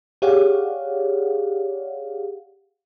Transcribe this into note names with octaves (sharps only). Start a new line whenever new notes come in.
G4 G#4 C#5 D5 F5 F#5